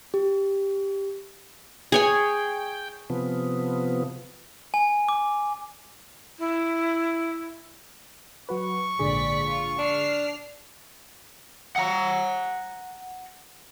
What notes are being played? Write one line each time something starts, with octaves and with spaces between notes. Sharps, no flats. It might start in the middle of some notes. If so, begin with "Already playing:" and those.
G4
G#4 C#5 G5 G#5
C3 F3 B3
G#5
D6
E4
F#3 F#4 B4 C#6
A#1 G#2 D3 G#4 D5 B6
F4
D4 F6 C7
F#5 A#5